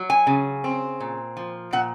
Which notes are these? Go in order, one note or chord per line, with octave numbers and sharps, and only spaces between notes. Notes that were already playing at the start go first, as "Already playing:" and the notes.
Already playing: F#3
G#5
C#3
C4
A#2
F3
A#2 F#5